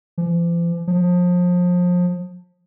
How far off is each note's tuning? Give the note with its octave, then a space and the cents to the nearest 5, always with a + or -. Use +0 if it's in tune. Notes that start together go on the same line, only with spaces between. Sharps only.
F3 -45
F3 +30